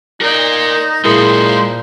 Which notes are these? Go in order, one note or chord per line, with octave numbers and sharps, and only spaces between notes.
D#4 A#4 D5
A#2 G#3 A#3 E4 G#4 A#4 C5